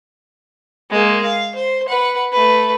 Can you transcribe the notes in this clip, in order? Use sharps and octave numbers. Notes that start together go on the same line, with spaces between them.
G#3 A#3
F5
C5
B4 F#5
A3 B4